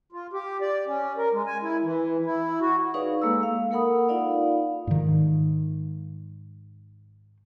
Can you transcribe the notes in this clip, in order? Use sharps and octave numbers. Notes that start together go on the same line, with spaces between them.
F4
G4
D5
C#4
A#4
G#3
G#5
E4
E3
E4
F#4
D#4 G#4 B4 C#5 D5 F5
G#3 A#3 A4 E6
F5
A#3 A4 A#4 F#5 B5 D#6
D#4 F4 D5 F5
G#2 D#3